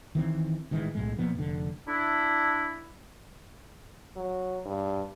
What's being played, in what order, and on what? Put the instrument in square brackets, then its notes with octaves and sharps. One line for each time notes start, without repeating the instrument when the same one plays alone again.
[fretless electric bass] D#3 E3 C4
A1 D#3 E3 G#3
B1 A2 G#3
A#2 F3 B3
F1 D3
[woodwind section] D4 E4
[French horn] F#3
G2